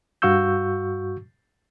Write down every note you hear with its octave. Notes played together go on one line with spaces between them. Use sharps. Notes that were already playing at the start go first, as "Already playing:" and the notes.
G2 F#4 F5 C#6 E6 G6